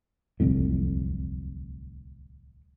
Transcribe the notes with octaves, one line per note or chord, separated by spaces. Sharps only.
D1 C2 F2 A2